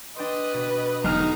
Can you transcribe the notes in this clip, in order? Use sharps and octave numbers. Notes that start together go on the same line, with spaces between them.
D4 B4 D#5 G5 C6
B2
E1 B1 D#4 A#5 F6